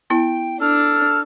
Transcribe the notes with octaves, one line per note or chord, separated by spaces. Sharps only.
B3 E4 G5
D4 A4 F6